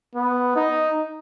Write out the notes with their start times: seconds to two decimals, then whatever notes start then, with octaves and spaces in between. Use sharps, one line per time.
0.15 B3
0.56 D#4